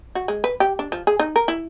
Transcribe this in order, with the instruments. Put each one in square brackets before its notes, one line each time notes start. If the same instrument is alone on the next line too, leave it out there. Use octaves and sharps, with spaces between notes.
[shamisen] F#4
G#3
B4
G4
D4
F3
G#4
D#4
A#4
E4